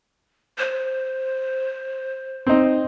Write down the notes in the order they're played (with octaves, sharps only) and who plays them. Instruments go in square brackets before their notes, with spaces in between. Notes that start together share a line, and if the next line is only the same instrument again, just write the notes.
[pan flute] C5
[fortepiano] C4 D#4